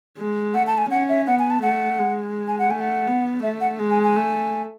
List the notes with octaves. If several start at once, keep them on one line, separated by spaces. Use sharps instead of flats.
G#3
A3 F#5
A5
G#5
C#4 F#5
E5
B3 F#5
G#5
A5
A3 F#5
G#3
G#5
F#5
A3 G#5
F#5
B3
A3 E5
F#5
G#3
G#5
G#5
A3